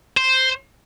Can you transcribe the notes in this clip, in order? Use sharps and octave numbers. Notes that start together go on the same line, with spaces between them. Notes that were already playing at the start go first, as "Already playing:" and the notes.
C5